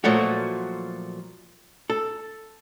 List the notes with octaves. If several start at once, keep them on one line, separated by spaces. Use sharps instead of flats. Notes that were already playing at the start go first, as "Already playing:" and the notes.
A#2 F3 F#3 A3 F#4
A4